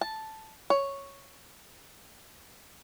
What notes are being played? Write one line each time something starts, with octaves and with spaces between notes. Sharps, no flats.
A5
C#5